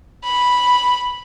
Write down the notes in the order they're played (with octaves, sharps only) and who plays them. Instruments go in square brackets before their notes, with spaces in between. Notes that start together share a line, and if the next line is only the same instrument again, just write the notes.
[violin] B5